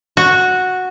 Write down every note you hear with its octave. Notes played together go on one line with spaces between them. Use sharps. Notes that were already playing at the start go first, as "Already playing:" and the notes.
F#4